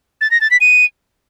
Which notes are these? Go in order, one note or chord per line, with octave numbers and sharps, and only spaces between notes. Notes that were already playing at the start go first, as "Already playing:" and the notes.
A6
A#6
A6
B6
D#7